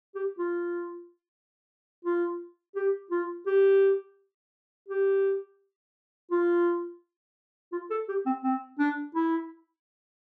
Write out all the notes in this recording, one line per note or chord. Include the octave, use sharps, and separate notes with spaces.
G4
F4
F4
G4
F4
G4
G4
F4
F4
A4
G4
C4
C4
D4
E4